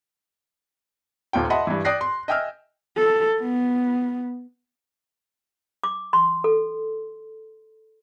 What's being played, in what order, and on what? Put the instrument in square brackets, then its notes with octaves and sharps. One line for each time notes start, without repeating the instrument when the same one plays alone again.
[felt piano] D#1 D#2 F4 G5
D#5 E5 F#5 A5 B5 C6
G2 E3
D5 G5 D#6 F#6 A#6 C7
C6
D#5 E5 G5 G#5 E6 F6
[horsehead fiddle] A4
B3
[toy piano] D6
C6
A4